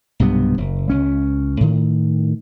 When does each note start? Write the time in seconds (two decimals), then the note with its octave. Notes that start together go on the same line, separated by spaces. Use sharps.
0.20 B1 G2 C3 B3
0.58 F#1
0.90 C#2 C#4
1.61 A2 D#3